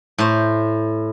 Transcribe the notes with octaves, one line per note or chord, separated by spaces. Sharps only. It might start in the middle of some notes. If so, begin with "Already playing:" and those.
A2 C5